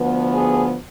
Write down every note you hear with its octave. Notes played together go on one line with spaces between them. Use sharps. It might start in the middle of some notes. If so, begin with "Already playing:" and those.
Already playing: D2 D3 F3 B3
G#4